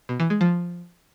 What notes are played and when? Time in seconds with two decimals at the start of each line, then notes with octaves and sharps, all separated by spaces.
0.09 B2
0.20 E3
0.30 G#3
0.41 F3